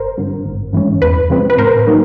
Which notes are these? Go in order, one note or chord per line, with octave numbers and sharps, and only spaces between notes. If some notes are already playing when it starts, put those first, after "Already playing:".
Already playing: G1 A#4 C5
G2 D3
G#1
G2 E3 G#3 C#4
E2 B4
C#3 F3 G#3 C4
B4
A2 A#4 C5
F#3 A#3 D#4